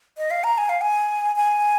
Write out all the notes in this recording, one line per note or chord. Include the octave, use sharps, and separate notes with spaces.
D#5
F5
A#5
G#5
F5
G#5
G#5